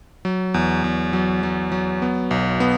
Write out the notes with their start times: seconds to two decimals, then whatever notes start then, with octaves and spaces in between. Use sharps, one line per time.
0.25 F#3
0.54 E2
0.84 E2
1.13 F#3
1.43 F#3
1.72 F#3
2.02 B3
2.31 B1
2.60 B3